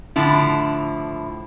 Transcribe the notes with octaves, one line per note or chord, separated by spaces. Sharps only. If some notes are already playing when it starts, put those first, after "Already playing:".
A2 D3 F3 E4